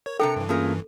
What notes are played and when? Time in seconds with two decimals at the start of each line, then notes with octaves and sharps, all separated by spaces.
0.06 A#4 C#5
0.20 C3 D4 A4 G5 A#5 C#7
0.36 G2 E3
0.49 A3 A#3 C#4 F4 G#4 A#4